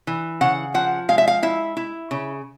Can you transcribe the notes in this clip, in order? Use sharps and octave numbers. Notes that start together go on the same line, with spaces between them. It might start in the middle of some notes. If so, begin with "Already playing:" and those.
E3
C#3 F#5
F3 F#5
G#3 F5
E5
F5
E4 E5
E4
C#3